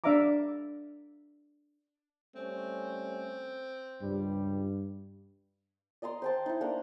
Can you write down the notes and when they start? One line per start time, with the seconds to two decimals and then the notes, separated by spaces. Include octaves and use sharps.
0.04 D4 D5 E5 F5 A#5 D6
2.35 G3 A3 C4 C#4
4.01 C#2 G2 G3
6.02 D5 D#5 A#5 C6
6.22 C5 G5 A5
6.46 D#4 E4
6.61 A#3 D4 A#5